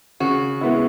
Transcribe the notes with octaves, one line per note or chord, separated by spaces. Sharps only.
C#3 F#4
G#3 B3 E4